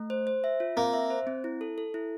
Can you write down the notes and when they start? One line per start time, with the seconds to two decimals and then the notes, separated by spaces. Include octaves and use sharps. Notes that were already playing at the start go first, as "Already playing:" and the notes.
Already playing: A3
0.10 C5
0.27 C5
0.44 E5
0.60 F4
0.77 A#3 C4
0.93 E5
1.10 C5
1.27 C4
1.44 E4
1.61 A4
1.78 A4
1.94 E4